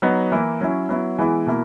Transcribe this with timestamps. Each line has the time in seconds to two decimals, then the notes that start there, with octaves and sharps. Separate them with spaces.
0.02 F#3 B3 D#4
0.32 E3 A#3 E4
0.61 F#3 C#4 E4
0.89 F#3 B3 E4
1.19 E3 G#3 B3 E4
1.47 B2 A#3 E4